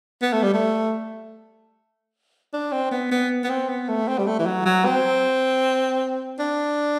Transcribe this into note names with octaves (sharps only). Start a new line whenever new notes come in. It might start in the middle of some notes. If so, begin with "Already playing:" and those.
B3
A3
G3
A3
D4
C4
B3
B3
B3
C4
B3
A3
C4
G3
A3
E3
F#3
F#3
C4
D4